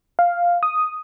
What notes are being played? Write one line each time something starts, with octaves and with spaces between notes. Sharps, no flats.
F5
D#6